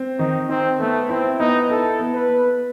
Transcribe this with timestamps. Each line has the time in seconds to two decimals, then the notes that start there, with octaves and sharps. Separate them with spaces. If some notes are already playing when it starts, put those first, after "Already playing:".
Already playing: C4
0.19 D#3 D#4
0.49 C4 D#4
0.79 A3 B3
1.09 C4 E4
1.40 B3 D#4
1.70 E4 A4
2.00 B3
2.14 B4
2.30 B3